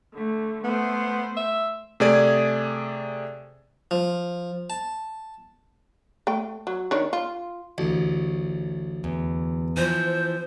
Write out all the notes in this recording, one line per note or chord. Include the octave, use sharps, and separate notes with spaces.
D3 A3
A3 B3 C5
E5
C3 A3 G#4 D5 G#6
F3
A5
A3 G5
F#3
D#3 D4 C#5
F4
A1 D2
E2
E3 F3 C5